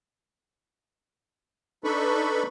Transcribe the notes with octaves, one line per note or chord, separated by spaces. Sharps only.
D4 D#4 A4 B4 B5 C#6